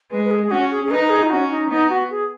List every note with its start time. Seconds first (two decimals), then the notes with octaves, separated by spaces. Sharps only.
0.11 G#3 B4
0.24 B4
0.31 G#4
0.43 G#4
0.51 C#4 F#4
0.71 G#4
0.84 G#4
0.90 D#4 B4
1.04 B4
1.10 G#4
1.23 D#4
1.30 C#4 F#4
1.51 D#4
1.70 B3 D#4
1.90 F#4
2.10 G#4